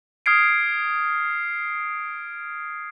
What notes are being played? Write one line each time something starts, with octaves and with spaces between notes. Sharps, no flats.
D#6 F6 G#6 C7 D7